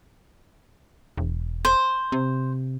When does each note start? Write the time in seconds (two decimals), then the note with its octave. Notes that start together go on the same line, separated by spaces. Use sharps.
1.17 E1
1.65 C5
2.12 C3